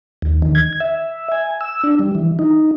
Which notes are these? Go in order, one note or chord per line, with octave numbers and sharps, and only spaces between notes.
D#2
D#3
G#6
E5
G#5
E6
D4
G3
E3
D#4